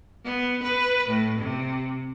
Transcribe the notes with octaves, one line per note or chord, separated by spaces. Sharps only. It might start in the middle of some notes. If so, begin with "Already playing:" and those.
B3
B4
A2
C3